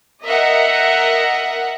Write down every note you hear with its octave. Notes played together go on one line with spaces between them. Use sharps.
A#4 D#5 E5 F#5